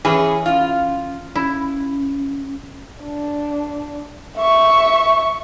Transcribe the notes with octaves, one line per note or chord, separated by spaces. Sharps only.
E3 C#4 G#4 E5
C#4 F4
C#4 E4
D4
E5 C#6